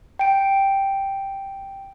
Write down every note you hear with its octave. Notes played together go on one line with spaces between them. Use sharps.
G5 D7